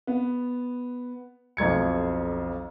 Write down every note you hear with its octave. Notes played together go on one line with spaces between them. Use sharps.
B3
B1 F2 G#6 C#7